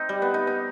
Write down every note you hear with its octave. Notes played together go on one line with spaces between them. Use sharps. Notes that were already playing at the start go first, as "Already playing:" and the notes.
Already playing: C4 D#4
G3
B3
D#4
D#4